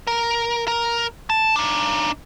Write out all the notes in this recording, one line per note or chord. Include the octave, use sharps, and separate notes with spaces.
A#4
A#4
A5
D4 D#4